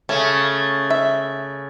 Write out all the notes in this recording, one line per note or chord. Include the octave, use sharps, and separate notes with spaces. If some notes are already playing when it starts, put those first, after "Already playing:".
C#3 A3 C#4
E5